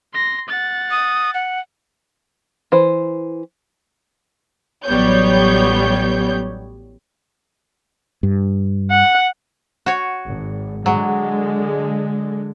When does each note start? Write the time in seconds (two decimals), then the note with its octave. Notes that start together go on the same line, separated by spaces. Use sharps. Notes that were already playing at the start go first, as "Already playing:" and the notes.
0.13 C6 A#6
0.48 F#5 A6
0.91 D#6
1.34 F#5
2.72 E3 C5
4.85 A1 F#3 G3 B3 C#5 G6
8.23 G2
8.91 F#5
9.86 F#4 C#5
10.26 G#1
10.86 D3 F#3 G#3